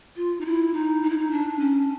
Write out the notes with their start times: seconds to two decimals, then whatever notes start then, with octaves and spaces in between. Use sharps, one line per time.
0.16 F4
0.41 D#4
0.46 E4
0.74 D#4
1.03 D#4
1.10 E4
1.17 D#4
1.31 D4
1.59 C#4